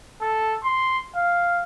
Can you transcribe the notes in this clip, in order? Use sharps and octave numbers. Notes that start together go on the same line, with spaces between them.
A4
C6
F5